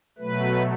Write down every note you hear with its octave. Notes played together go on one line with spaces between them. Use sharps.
B2 F#3 A3 B4